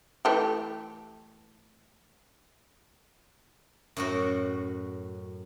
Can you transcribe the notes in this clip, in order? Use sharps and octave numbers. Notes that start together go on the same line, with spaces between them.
E3 A3 G4
F#2 A2 F#4